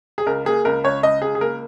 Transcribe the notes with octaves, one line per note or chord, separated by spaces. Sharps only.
G#4
C#2 A#4
A#3 G#4
C#2 A#4
C#2 C#5
C#2 D#5
C#2 G#4
G#4
A#3 A#4